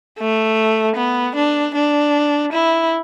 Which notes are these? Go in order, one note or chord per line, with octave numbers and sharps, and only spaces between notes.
A3
B3
D4
D4
E4